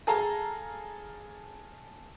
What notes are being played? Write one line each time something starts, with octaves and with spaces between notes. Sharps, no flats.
G#4 A4 F5 A#5